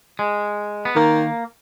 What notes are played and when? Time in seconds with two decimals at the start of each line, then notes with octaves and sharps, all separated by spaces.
0.19 G#3
0.85 B3
0.96 D#3 A#3